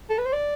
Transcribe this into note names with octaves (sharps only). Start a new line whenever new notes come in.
A4
B4
C5
D5